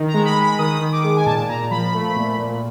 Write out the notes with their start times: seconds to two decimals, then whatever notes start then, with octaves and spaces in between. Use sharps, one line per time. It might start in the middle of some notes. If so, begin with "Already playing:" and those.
Already playing: D#3
0.08 A#5
0.14 G#3
0.25 B5
0.36 G#3
0.42 B5
0.59 D#3 D#6
0.81 D#3
0.93 D6
1.04 G#3
1.16 G#5
1.26 A#2 A5
1.49 A#2 A#5
1.71 F3 B5
1.94 A3
2.16 A#2
2.39 A#2